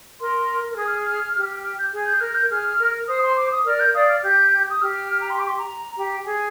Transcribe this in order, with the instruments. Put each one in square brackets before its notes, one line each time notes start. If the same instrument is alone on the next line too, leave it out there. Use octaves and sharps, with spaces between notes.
[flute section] A#4 [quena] C6
[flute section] A#4
[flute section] G#4 [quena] D#6
[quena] F6
F6
[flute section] G4
[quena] F6
G6
[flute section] G#4
[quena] G6
[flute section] A#4 [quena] F6
[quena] G6
[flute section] G#4 [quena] F6
[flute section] A#4
[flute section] C5 [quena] D#6
[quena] C6
D6
D#6
[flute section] A#4 D5 [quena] F6
[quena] G6
[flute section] D5 F5 [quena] D#6
[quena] F6
[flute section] G4 [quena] G6
[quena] D#6
[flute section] G4 [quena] F6
[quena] A#5
C6
D6
C6
A#5
[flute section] G4
[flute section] G#4 [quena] G#5